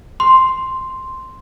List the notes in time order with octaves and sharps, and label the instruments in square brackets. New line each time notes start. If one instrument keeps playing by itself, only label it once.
[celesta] C6